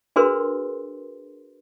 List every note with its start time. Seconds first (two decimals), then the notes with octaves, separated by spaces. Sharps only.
0.16 D4 F#4 G#4 A#4 B4 C6